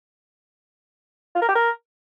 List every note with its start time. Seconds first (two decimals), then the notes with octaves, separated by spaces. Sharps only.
1.35 F4
1.42 A#4
1.49 G4
1.55 A#4